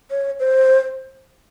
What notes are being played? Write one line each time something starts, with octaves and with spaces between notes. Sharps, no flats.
C#5
C5